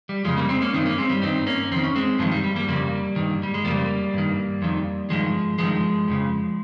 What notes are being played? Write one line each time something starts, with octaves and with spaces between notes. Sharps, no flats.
G3
F2 C#3 F3 G#3
G3 A#3
G#3 C4
A#3 C#4
G2 D#3 C4 D#4
A#3 C#4
G#3 C4
G3
G2 D#3 C4 D#4
A#3 C#4
F2 D#3 C4
C#4
G#3 C4
G2 D#3 F3 G#3
G3
G3
G3 A#3
F2 C#3 G3 A#3
G2 D#3
G3
G#3
F2 C#3 G3 A#3
G2 D#3
F2 D#3
G2 D#3 F3 G#3
G2 D#3 F3 G#3
F2 C#3